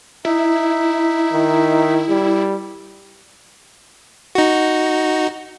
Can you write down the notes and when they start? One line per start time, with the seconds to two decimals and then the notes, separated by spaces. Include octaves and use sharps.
0.25 D#4 E4 E5
1.32 D#3
2.09 G3
4.35 D#4 F#4